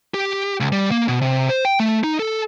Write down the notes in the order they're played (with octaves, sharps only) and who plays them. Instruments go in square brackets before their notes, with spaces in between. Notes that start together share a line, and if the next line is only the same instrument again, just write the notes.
[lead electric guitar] G4
C#2
G3
A#3
B2
C3
C5
G5
A3
D#4
A4